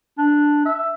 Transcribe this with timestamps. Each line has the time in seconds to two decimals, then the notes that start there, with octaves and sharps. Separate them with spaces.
0.18 D4
0.66 E5